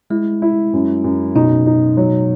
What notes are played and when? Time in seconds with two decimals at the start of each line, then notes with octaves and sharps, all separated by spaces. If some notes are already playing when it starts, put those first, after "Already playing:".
0.10 G#3 E4
0.42 E4
0.73 F#2
1.04 F#2
1.36 B2 D#4
1.66 D#4
1.97 F#3